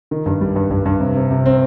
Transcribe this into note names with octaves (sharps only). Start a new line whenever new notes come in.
D#3
G2
G3
G2
G2
G2
C3
C3
C3
C4